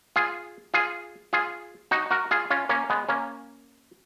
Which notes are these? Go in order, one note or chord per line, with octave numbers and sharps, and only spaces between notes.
F4 G#4
F4 G#4
F4 G#4
D#4 F#4
F#4 A#4
F4 G#4
C#4 F4
A#3 C#4
G#3 B3
A#3 C#4